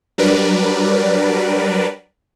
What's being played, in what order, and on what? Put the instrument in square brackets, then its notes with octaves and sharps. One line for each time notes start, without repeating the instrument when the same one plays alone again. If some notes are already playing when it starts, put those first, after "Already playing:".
[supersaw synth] F#3 G3 D4 A#4 B4 D5